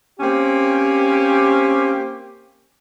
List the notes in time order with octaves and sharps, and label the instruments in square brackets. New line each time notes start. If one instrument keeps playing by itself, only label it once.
[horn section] A#3 C4 C#4 G4